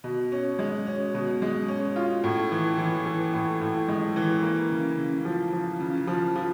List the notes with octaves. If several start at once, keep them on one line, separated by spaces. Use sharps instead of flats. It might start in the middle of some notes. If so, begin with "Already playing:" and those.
B2
C#4
G#3
C#4
B2
G#3
C#4
F4
A2
E3
E3
E3
A2
A2
G#3
E3
A#3
C#3
C#3
F3
F3
C#3
F3
F3